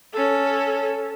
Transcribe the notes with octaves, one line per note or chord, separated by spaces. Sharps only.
C#4 A4